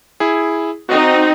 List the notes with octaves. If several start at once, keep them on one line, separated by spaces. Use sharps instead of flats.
E4 G#4
C4 D#4 F#4 D#5